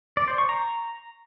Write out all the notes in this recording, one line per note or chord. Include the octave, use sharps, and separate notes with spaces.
D5
C5
C#6
A#5